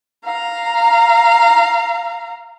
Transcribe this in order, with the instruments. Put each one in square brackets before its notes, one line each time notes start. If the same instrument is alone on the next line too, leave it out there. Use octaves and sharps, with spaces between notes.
[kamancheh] F5 A#5